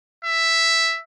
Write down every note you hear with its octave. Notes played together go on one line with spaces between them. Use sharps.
E5